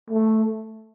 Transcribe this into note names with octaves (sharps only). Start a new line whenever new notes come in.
A3